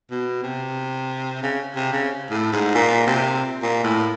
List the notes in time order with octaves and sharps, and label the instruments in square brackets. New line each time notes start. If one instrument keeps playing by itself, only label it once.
[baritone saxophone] B2
C3
C#3
C3
C#3
A2
G#2
A#2
C3
A#2
A2